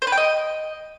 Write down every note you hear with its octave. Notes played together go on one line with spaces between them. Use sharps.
C5
B4
G5
D#5